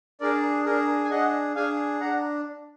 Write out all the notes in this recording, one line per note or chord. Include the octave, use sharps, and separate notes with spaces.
D4 G#4 A#4 D5
D4 G#4 A#4
G#5
D4 G#4 D#5 F#5
D4 G#4 F5 G#5
D4 F#5 A#5